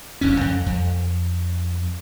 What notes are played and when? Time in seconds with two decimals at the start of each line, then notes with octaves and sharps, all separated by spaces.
0.21 F#1 F#2 C#4
0.41 F2
0.66 F2